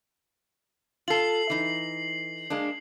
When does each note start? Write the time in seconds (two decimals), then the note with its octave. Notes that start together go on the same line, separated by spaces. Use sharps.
1.08 F4 A4 C7 F#7
1.50 E3 D#4
2.50 G#3 A#3 D4